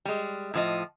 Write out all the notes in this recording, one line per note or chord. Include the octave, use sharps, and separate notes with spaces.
G3 G#3
A2 F3 D#5